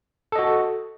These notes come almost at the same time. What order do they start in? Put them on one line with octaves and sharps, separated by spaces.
A4 D#5 F#4